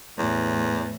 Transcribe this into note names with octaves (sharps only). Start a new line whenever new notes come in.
E2 A2 E3